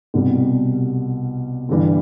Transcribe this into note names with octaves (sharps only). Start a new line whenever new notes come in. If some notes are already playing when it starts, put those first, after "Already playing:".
C2 B2 G3
G1 G2 E3 G3